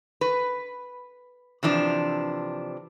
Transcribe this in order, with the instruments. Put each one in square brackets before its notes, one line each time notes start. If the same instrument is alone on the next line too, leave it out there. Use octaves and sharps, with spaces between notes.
[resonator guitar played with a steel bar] B4
C3 E3 F3 D4